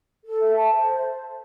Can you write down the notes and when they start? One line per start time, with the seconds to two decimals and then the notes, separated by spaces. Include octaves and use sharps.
0.24 A4
0.40 E5
0.56 A5
0.72 C5